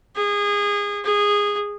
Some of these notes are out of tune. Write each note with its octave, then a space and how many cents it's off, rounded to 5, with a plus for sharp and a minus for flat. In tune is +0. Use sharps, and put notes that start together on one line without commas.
G#4 -25
G#4 -15